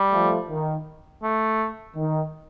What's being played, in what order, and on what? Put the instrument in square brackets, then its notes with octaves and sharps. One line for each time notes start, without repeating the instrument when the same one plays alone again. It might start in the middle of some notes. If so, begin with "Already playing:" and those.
Already playing: [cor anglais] G3
[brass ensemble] F3 A3
D#3
[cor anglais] A3
[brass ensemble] D#3